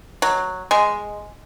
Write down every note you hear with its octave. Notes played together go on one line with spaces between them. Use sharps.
F#3
G#3